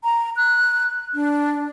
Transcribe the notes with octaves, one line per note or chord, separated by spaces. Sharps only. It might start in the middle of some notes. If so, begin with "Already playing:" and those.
A#5
F#6
D4